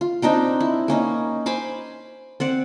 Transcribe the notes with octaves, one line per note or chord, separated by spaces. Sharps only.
F4
C4 D4 D#4 G5
E4
A#3 C#4 D#4
C5 G#5 B5 D6
C4 D5 F#5